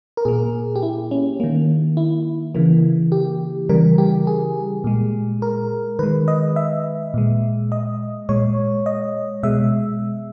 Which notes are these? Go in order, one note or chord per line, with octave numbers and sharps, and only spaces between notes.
A#4
A#2 A#3 G#4
G4
E4
C#4
D#3 A#3
E4
C#3 E3 A#3
G4
C#3 E3 G3 A#4
G4
G#4
A#2 G#3
A#4
D#3 G#3 B4
D#5
E5
A#2 G#3
D#5
A#2 G#3 C#5
D#5
B2 G#3 E5